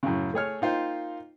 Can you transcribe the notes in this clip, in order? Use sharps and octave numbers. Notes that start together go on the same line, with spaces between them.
F#2 A2 C#3
A3 G#4 C#5 F6
A#3 D#4 F4 C5 G5